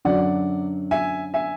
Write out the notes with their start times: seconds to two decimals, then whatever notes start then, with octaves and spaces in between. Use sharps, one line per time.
0.05 F#2 D3 F#3 D5 F#5
0.91 E5 G#5
1.34 E5 G#5